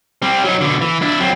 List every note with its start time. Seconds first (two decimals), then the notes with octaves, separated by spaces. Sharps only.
0.22 G3 C4
0.44 F#3 D#4
0.61 B2 D3
0.81 E3
1.02 D4 E4
1.20 F#3 C4